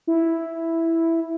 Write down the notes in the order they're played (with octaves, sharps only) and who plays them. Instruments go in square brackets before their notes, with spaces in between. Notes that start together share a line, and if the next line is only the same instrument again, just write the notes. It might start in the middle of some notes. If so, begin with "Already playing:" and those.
[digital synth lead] E4